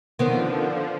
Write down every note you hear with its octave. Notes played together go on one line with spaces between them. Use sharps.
D3 D#3 F3 B3 C4